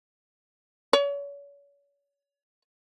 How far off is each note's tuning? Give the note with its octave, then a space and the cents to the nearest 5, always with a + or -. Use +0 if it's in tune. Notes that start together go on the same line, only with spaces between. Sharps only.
C#5 +40